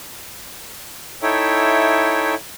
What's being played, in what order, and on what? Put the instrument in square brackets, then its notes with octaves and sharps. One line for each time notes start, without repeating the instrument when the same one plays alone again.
[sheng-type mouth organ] D#4 E4 A4 C#5 E5 G5